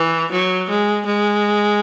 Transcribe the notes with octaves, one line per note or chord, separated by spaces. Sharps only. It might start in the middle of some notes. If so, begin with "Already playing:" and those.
Already playing: E3
F#3
G#3
G#3